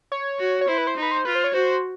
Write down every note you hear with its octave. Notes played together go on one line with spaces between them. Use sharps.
C#5
F#4
C#5
E4 C5
B4
C5
D#4
B4
C5
F4 B4
C5
C#5
F#4 C5